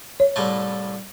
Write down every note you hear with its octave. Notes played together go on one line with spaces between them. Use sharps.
C#5
C2 A2 A3